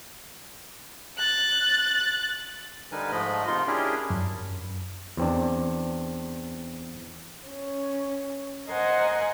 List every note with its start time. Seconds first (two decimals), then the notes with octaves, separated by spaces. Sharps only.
1.17 F#6 A6
2.92 D3 G3 D#4 A#4 B4 G#5
3.12 G#2 F3 G#3 A3 D#5 B5
3.47 C3 D#4 F4 A#4 C6
3.67 C#4 D4 E4 G4 G#4 A#4
4.10 F#2
5.17 E2 C4 D4
7.47 C#4
8.69 A#4 C5 D#5 F#5 G#5